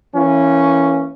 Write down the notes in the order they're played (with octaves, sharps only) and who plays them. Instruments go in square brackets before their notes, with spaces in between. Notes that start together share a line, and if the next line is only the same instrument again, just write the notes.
[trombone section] E3 A#3 C#4